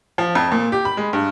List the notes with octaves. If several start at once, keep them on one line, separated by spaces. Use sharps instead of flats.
F3
F2
A#2
G4
B5
G#3
G2